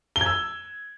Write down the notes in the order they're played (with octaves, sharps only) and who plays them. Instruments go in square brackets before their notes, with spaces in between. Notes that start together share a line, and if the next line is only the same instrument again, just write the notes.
[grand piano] G7
G#6
E6